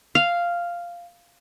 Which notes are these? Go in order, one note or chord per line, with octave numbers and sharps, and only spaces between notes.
F5